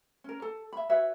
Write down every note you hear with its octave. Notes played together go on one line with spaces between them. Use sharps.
C#4 A#4
A4 A5
E5 B5
F#4 B4 C#5 E5